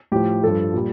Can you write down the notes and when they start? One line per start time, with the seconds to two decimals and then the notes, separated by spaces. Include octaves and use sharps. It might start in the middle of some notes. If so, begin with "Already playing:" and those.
0.12 A2 F3 G4
0.43 G2 F3 A4
0.74 A#2 G3